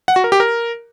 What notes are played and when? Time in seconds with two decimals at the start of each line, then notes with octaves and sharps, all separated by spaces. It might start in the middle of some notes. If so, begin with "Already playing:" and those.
0.08 F#5
0.16 F#4
0.24 A#4
0.32 G4
0.40 A#4